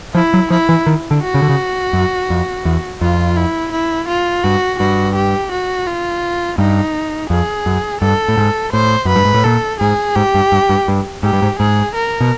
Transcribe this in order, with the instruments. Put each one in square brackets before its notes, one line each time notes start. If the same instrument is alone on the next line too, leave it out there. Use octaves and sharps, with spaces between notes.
[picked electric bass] F3 [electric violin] E4
[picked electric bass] F#3
[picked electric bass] F3 [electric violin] E4
[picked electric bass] E3
D#3
D3
[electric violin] F#4
[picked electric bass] C#3
D3
C#3
F#2
F2
E2
[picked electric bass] F2 [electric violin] F4
[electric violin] E4
E4
F4
[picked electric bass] G2 [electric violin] F#4
[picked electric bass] G2 [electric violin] F#4
[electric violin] G4
F#4
F4
[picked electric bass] G2 [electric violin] D#4
[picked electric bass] F2 [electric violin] G#4
[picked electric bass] F#2
[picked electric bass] G2 [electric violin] A4
[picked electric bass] A2
G#2
[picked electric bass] A2 [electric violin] C5
[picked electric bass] F#2 [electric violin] B4
[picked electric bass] G2
G#2
A2
[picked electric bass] A#2 [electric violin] A4
[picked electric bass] G#2 [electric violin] G#4
[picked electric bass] G#2 [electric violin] G4
[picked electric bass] G2
G2
G2
G2
[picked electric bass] G#2 [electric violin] G4
[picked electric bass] G2
G#2
[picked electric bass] G#2 [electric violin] G#4
[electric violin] A#4
[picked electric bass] B2